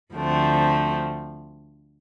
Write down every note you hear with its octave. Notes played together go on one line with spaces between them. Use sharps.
D2 D3 F3 A3 C4